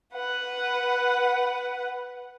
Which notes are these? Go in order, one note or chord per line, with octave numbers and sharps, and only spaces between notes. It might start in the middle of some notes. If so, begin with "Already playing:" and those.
B4 F#5